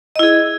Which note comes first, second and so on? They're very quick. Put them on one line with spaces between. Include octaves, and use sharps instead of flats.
D#5 E4 G#4